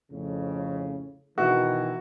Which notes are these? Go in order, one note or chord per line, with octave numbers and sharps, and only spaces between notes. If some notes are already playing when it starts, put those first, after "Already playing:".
F2 A2 C#3
B2 D#3 E3 F#4